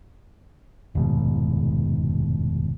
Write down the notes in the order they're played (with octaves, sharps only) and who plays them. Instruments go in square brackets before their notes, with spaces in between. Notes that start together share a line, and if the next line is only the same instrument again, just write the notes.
[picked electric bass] F1 D#2 G#2 B2